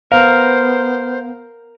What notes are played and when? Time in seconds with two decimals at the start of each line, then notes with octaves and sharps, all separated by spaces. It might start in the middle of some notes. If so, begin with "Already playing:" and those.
0.12 B3 A#4 C5 F5